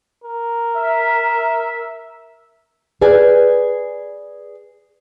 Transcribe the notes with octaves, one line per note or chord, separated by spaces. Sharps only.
A#4
E5
G#4 B4 D5 G#5